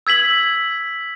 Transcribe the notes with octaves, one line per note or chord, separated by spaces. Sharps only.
E6 G#6 B6 F#7